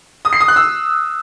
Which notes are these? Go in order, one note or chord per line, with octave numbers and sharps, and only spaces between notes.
D#6
C7
D#6
F#6
E6